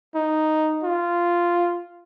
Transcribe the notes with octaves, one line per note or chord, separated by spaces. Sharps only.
D#4
F4